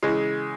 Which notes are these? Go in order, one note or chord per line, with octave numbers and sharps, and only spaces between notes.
C#3 E3 G#3